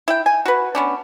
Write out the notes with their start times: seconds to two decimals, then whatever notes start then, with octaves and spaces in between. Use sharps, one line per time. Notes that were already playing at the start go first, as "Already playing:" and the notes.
0.08 E4 G5
0.26 G#5
0.45 F#4 B4
0.75 B3 C#4 D4